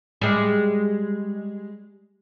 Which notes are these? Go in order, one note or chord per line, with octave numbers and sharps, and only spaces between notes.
G3 G#3